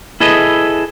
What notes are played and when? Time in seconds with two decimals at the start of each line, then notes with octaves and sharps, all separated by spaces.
0.20 E4 G#4 A4 B4 D#5